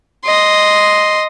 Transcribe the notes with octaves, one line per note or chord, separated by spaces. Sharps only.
D#5 C6